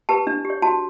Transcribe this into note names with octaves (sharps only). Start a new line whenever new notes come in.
G4 B4 A5
D4
G4
C#5
F#4 A5